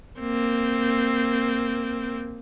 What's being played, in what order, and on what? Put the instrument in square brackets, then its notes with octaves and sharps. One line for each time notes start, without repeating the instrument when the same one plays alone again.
[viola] A#3 C4